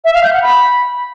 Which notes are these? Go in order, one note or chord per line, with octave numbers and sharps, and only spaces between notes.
E5
F5
G6
F#5
B5